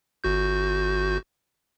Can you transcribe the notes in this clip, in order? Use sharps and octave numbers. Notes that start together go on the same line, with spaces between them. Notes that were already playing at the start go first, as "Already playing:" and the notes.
G1 F#4 G6